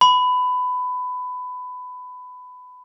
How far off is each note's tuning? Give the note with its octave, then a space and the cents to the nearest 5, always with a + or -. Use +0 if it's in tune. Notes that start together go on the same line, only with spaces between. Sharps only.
B5 +20